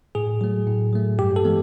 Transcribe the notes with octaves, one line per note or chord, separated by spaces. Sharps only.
A2 G#4
F#3 A3
A2
F#3 A3
G2 G4
A4
E3 G#3 B3